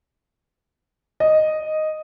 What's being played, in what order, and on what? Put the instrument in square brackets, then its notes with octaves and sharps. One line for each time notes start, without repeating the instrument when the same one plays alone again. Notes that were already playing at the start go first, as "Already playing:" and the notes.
[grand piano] D#5